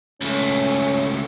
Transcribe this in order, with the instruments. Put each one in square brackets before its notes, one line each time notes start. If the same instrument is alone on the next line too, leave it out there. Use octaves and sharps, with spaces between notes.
[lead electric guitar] C#2 A3 [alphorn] C#4